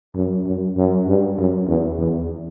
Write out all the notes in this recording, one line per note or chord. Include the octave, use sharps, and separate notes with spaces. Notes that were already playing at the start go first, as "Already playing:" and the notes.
F#2
F#2
F#2
G2
F#2
E2
E2